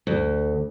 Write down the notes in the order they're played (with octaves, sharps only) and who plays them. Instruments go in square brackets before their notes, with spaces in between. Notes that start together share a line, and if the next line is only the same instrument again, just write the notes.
[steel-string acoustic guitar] D2